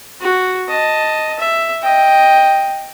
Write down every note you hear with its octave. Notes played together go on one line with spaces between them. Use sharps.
F#4
D#5 A5
E5
D#5 G5